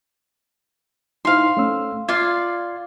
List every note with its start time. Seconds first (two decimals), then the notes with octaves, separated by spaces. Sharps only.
1.25 D#4 E4 C5 F5 C6
1.57 A3 C#4 E6
2.09 F4 D5 F5 G#6